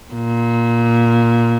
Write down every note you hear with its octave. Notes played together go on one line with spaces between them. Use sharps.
A#2